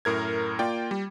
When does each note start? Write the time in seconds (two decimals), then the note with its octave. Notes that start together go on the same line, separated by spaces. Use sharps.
0.05 F#2 A2 A#4 G#6
0.59 A#3 F4 D5 G5
0.91 G3